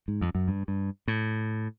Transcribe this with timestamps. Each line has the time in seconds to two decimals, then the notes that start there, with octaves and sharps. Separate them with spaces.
0.08 G#2
0.21 F2
0.35 F#2
0.48 G2
0.68 G2
1.08 A2